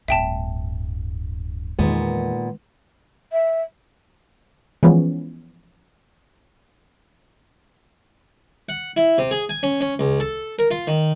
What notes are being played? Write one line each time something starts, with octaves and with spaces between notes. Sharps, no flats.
D1 G2 E5 G5 A5
E2 A#2 D#3 G#3 B3
E5
E3 F3 G#3 B3 C#4
F#5
E4
C3
G#4
G#5
C#4
C#4
C#2
A4
A#4
F4
D#3